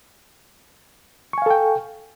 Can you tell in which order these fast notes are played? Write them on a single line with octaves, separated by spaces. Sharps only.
C#6 G#5 F5 A4 G5